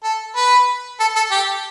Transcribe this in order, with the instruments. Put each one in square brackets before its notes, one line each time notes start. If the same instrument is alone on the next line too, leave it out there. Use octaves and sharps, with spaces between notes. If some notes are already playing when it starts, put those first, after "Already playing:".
[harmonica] A4
B4
A4
A4
G4